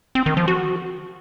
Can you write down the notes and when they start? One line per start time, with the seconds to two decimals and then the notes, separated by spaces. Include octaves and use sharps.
0.15 C4
0.26 D#3
0.37 F3
0.48 F#4